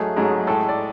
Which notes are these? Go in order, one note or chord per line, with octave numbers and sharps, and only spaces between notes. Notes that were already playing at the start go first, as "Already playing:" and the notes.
Already playing: G#2 F#3 A3 G#4
G#2 F#3 A3 G#4
A2 G#3 A4
D5